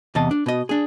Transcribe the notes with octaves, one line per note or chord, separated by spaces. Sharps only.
E2 C3 D#5 A5
D4
B2 D#5
D4 G#4